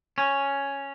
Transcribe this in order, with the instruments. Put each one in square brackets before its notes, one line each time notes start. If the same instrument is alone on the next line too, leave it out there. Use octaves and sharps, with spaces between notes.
[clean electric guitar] C#4